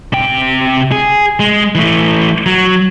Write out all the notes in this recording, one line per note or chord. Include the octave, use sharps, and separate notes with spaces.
C3 G5
G#4
G#3
E3 A3
F#3